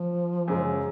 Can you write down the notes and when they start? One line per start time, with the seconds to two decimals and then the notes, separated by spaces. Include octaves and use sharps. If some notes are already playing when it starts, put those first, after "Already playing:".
Already playing: F3
0.48 F#2 C#3 G#3